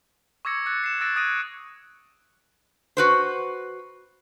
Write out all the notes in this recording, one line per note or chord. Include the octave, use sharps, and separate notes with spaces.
C#6 D6 E6 G#6 A#6 C#7
F#6 A6 C#7
C7 E7
E6 F#6 A6 A#6 D7
D#6 F#6 G#6 A#6 D7 D#7
F#4 B4 C5